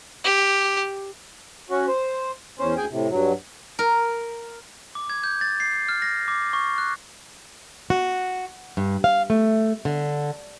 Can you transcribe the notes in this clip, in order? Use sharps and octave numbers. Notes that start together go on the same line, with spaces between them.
G4
C#4 F#4
C5
E2 C#4 C5
D2 G#4 G5 G#5
A2 C3
G2 F#3
A#4
D6
G#6
G6
A6
C7
F6
A#6
D6
C#6
F#6
F#4
G2
F5
A3
D3